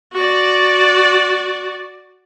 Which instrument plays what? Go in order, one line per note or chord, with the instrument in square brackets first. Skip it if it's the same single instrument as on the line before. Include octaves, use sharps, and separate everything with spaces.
[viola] F#4 D5